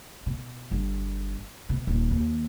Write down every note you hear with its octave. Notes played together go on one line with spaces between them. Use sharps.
B2
G1
B2
D#1
D#2